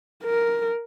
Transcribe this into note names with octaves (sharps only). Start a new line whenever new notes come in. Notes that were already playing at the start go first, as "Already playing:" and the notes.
A#4